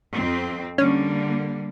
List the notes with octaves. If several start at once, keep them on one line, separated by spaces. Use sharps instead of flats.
F2 C4
D3 G3 A#3 C#4